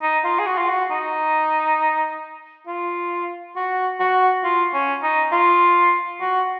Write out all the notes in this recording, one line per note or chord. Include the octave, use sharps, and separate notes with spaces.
D#4
F4
G#4
F#4
F4
F#4
D#4
F4
F#4
F#4
F4
C#4
D#4
F4
F#4